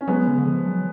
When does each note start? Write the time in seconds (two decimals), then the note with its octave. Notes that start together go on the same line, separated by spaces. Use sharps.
0.01 C#4
0.07 F#3 G#3 B3
0.27 D3
0.38 D3
0.47 F3
0.66 F#3